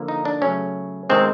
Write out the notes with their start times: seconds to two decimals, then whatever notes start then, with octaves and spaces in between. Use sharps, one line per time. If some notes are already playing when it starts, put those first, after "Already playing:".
Already playing: D3 F3 A#3
0.08 D#4
0.25 D4
0.42 C#3 F#3 A3 C#4
1.09 C3 D#3 G#3 C4